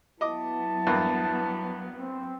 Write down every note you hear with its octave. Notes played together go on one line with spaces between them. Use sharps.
F#3 B3 E4 D#5 A5 D6
E2 G2 A#3
C4